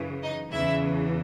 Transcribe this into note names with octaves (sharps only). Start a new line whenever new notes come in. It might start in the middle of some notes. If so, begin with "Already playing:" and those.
Already playing: F#2 C#3 E3
D#4 D#5
E2 C#3 E3 E4 E5